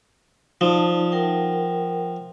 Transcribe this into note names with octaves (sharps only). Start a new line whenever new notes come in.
F3 D#4 D5 A5
A#4 F#5 G5